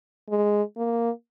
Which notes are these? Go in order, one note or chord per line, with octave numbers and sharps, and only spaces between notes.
G#3
A#3